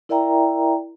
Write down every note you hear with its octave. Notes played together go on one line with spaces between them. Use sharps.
E4 A#4 D5 E5 G5 A#5